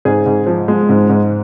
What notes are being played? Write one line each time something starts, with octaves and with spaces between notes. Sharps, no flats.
G#2 G#4
G#2
F3
G#3
G#2
G#2